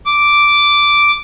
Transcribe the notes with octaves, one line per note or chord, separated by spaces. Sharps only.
D6